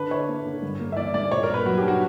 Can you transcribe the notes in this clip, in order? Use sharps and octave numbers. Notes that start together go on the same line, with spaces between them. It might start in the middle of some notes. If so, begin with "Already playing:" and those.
Already playing: D3 D4 B4
E4 C#5
A#3
D3
G2
A#3
E5
E3 D5
G2 D5
A#2 C#5
A#3 A#4
B4
F#3 F#4
G4
D4
F#4